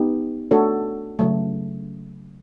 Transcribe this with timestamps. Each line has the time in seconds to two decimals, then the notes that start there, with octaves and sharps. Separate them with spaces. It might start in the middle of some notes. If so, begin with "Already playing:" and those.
Already playing: B3 D#4 G4
0.51 A3 D4 F#4 A4 C#5
1.19 C#3 F#3 A3